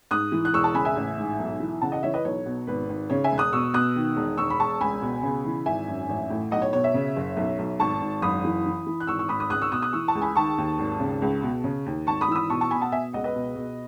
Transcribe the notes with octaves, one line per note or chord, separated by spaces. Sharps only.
G#2 D#6 F#6
E3
F#6
E1 C#6 E6
A5 C#6
C#3 G#5 B5
E5 G#5
A1
G#2
B1
E3
C#3 F#5 A5
D#5 F#5
E3 C#5 E5
B4 D#5
B1 C#5
B2
G#1 B4
G#1
C#3 C#5
E5 G#5
E1
D#6 F#6
B2 C#6 E6
B2 D#6 F#6
D#3
E1
E1 C#6 E6
B5
E1 A5 C#6
C#2 G#5 B5
B2
C#3
E3
G#1 E5 G#5
F#2
A1
A2
B1 D#5 F#5
C#5
B2 C#5
C#5 E5
C#3
F#1
B1
B1
G#1 A5 C#6
G#1
F#1 B5 D#6
E3
E3
E3
F#6
G#1 C#6 E6
C#6 E6
G#1 B5 D#6
B5 D#6
C#2 D#6 F#6
C#6 E6
B2 D#6 F#6
D#6 F#6
E3 C#6 E6
A5 C#6
C#2
G#5 B5
D#3 A5 C#6
D#2
G#1
C#3
C#2
B2
C#3
D#2
G#1 A5 C#6
B5 D#6
E3 E6
B5 D#6
B2 A5 C#6
A5 C#6
B2 G#5 B5
F#5 A5
B2 E5 G#5
C#2 D#5 F#5
B4 D#5
B2
B2